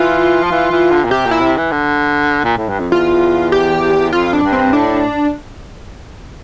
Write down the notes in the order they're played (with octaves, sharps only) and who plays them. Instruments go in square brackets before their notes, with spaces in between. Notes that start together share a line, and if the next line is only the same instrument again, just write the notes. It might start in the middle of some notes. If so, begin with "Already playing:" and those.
Already playing: [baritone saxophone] E3 [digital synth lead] F4
[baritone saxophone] F3
E3
E3
D3
A#2
[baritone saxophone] C3 [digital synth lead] G4
[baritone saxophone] A#2
[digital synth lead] E4
[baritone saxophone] C3
E3
D3
A#2
A2
G2
F2
[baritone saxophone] E2 [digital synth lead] F4
[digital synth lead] G4
[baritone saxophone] F2 [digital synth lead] F4
[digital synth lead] D4
[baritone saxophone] G2
[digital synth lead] C4
[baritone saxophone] A2 [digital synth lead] D4